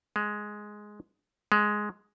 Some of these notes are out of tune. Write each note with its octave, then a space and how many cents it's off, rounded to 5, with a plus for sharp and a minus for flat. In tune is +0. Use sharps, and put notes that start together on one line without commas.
G#3 +5
G#3 +5